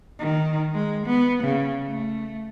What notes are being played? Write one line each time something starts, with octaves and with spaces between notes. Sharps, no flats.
D#3
G#3
B3
C#3
A3